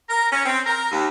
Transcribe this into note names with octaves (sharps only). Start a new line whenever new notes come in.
A#4
C#4
C4
A#4
D#2